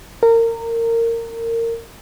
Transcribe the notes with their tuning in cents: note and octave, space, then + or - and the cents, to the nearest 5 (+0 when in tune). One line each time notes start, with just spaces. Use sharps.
A#4 -25